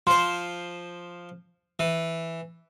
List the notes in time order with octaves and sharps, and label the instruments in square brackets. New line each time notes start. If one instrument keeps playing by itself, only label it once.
[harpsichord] F3 C5 [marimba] C6
[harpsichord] E3